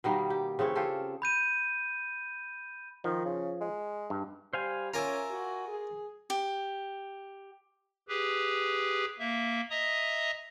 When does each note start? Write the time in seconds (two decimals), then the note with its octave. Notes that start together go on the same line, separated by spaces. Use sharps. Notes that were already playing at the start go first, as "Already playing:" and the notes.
0.04 B2 D#3 G3 A#3
0.30 G4
0.59 C#3 E3 C4 C#5
0.75 F4 G4 A4
1.22 B5 G6 D#7
3.04 D#3 F3
3.25 C#3
3.61 G#3
4.10 G2
4.53 G3 C5 F5 G#5
4.94 C#4 F4 A#4 E5 G#5 A#5 D6
5.31 F#4
5.67 G#4
6.30 G4
8.08 G4 G#4 B4
9.19 A#3 E5
9.70 D#5 E5 A#5 D#6